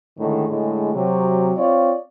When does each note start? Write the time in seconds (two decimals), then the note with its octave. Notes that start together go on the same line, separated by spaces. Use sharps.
0.18 A2 D3 D#3 G#3
0.48 A2 D3 G#3
0.94 C3 F#3
1.56 C4 F4 C#5 D5